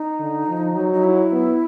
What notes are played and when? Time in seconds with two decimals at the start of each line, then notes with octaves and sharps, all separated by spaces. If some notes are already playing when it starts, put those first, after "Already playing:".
Already playing: D#4
0.19 D3
0.47 F3
0.75 F#3
0.93 D#4
1.03 E4
1.32 B3